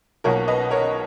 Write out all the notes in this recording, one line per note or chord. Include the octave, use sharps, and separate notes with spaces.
B1 B2 A#3 A#4 C#5
B4 D#5
A#4 C#5